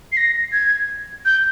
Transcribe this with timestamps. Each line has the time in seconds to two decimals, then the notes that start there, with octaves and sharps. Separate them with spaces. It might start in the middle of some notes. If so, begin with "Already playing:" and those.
0.12 C7
0.17 A#6
0.52 G#6
1.25 G6